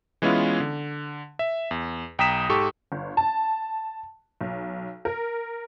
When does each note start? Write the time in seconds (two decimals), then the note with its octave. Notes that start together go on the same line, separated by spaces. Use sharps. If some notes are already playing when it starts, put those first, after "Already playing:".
0.22 E3 G#3 B3 C#4 E4 F4
0.60 D3
1.39 E5
1.71 E2
2.19 B1 G5 A#5 D#6 B6 E7
2.50 G#2 G4 A4 C#6
2.92 G1
3.17 A5
4.41 B1
5.05 A#4